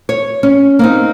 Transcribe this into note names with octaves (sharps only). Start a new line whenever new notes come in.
C#5
C#4
A#3 C4 D#4